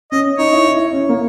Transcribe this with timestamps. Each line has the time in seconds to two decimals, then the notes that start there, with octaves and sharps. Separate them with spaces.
0.12 C#4 D#5
0.38 D#4 C#5
0.52 E4
0.66 E4
0.80 E4
0.93 C#4
1.09 A#3